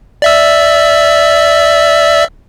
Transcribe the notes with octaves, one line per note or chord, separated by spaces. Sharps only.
D5 E5 E6